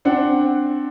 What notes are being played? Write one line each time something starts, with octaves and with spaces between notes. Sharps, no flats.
C4 D4 F#5